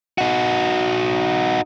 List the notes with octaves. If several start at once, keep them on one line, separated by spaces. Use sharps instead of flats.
D#4 F#4